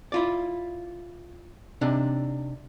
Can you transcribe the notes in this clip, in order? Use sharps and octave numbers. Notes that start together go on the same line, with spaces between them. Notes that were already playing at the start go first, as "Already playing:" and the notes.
E4 F4 D5
C3 D4 D#4